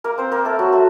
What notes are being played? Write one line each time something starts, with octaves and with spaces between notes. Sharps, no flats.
A#3 A#4
C4 C5
A#3 A#4
A3 A4
F#3 F#4
A3 A4